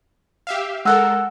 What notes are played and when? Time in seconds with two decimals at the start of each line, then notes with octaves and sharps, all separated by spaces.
0.47 G4 E5 F5
0.85 G#3 A4 A#4 F#5 E6 F#6